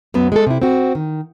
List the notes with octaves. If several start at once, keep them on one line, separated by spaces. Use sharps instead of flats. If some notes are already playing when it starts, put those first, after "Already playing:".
F#2 F#3 B3
G#3 G#4 A4
C3 E4
C4 F#4
D#3